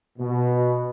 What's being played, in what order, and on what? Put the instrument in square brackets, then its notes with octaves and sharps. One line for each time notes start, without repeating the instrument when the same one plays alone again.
[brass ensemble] B2